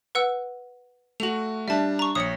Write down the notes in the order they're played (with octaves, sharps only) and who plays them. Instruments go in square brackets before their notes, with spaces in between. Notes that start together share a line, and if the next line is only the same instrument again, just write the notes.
[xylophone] B4 F#5 E6
[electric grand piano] A3 F#4 [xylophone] F7 F#7
[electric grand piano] G3 D4 [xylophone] E5 A5
[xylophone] A#5 C#6
[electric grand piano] A#1 C#5 [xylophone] D#6 C#7